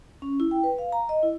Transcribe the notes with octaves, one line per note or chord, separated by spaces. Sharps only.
C#4
E4
G5
B4
F5
A#5
D#5
E4